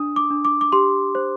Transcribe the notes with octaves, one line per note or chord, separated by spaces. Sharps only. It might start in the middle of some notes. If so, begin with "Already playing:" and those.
Already playing: D4 D#6
D6
D4
D6
D6
G4 C6
C5